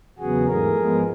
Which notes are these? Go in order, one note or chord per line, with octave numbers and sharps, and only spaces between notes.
E2 C#3 F#3 B3 F#4 G#4
G#2 E3 A3 G#4 A#4
G#2 F3 G#3 B3